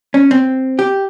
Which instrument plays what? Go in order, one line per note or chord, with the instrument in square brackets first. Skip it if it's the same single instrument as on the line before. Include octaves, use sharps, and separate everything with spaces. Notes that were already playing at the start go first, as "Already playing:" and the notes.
[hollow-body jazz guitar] C#4
C4
G4